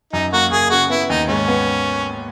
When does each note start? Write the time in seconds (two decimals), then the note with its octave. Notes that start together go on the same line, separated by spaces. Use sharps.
0.13 F#2 D#4
0.33 A#3 F#4
0.52 F#1 G#4
0.71 C#3 F#4
0.90 B3 E4
1.09 D#2 D#4
1.29 G#2 C#4
1.48 B3